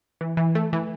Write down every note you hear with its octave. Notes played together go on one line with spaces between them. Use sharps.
E3
E3
A3
E3